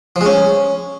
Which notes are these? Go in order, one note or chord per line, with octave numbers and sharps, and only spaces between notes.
F3
G#3
C#4